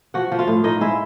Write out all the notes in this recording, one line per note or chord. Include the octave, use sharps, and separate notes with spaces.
F3 F#4 F#5
F3
F4 F5
A2
A2 D#4 D#5
G#3 E4 E5